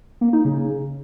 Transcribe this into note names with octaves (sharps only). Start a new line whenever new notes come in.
A#3
D#4
C#3